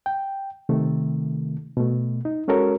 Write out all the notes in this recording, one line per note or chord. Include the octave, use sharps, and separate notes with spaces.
G5
C3 D#3 A3
B2 A3
D#4
G#3 C#4 F#4 A4 A#4 C#5